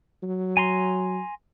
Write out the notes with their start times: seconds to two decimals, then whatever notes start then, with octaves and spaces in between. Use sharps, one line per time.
0.23 F#3
0.57 G#5 A#5 C6